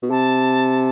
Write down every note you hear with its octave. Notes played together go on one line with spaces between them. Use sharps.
B2
C3 A5